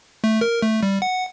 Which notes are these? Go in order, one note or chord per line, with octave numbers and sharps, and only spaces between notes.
A3
A#4
A3
G3
F#5